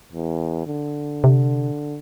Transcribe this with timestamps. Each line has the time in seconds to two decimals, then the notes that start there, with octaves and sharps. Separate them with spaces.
0.13 E2
0.67 D3
1.24 C3